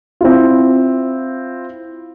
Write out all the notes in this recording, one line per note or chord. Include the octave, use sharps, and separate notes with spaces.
C4 E4 F4